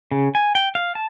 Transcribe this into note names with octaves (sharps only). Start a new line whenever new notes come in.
C#3
G#5
G5
F5
A5